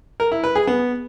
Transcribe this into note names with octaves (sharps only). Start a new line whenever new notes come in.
A#4
E4
B4
G#4
B3